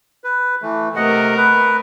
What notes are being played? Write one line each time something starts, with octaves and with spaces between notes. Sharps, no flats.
B4
E3 A3
C3 A3 A#4 D#5 F#5
B4